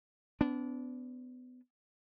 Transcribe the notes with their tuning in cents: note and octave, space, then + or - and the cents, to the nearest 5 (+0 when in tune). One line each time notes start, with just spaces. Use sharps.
B3 +30 D4 -25